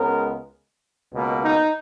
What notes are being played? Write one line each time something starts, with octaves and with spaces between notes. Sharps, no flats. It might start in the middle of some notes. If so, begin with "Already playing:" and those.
Already playing: C#2 C#3 G#3 B3 A#4
C#2 B2 A#3
D#4